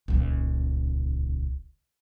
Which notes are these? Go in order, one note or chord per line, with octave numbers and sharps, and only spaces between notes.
D#1 C#2